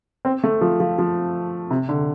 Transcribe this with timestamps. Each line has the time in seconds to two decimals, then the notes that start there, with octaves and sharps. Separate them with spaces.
0.25 C4
0.44 A3
0.61 F3
0.80 F3
0.99 F3
1.70 C3
1.89 D3